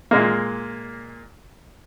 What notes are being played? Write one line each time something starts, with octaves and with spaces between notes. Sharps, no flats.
A#2 G#3 A#3